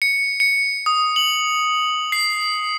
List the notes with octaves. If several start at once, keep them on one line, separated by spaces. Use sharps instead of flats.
C#7
C#7
D#6
F#7
C7